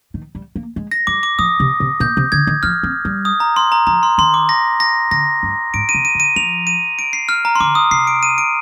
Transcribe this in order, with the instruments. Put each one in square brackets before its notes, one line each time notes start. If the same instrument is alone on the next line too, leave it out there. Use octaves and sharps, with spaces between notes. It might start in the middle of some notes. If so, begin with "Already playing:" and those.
[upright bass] D#3
G3
A#3
G#3
[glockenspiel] A#6
[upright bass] G3 [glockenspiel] D6
[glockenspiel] D6
[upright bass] F3 [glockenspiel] D#6
[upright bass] C3
C3
[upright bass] A#2 [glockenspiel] G6
[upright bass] C3
[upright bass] D3 [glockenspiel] G#6
[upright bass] D#3
[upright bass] F3 [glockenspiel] F6
[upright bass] C4
G3
[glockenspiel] D#6
A#5
C6
A#5
[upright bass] F3 [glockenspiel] A#5
[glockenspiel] C6
[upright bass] D#3 [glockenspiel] C6
[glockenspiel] D6
A#6
A#6
[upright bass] D3 [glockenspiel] A#6
[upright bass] G2
[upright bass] G#2 [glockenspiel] D7
[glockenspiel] D#7
[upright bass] C3
[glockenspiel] D#7
[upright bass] D3
[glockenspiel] D#7
[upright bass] F3 [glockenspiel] F7
[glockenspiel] D#7
D7
C7
F6
A#5
C6
[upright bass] D3 [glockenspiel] D6
[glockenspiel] D#6
[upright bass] C3 [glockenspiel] C7
[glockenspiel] D7
D#7
D7